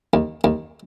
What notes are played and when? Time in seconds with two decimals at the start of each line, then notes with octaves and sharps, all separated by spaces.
0.14 D#2
0.44 D#2